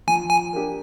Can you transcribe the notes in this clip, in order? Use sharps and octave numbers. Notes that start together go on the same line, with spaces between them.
F3 G#5
G#5
A#3 D4 G4